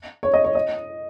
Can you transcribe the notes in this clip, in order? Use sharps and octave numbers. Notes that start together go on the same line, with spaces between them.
C#5
D#5
C#5
D#5